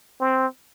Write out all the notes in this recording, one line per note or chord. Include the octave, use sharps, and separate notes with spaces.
C4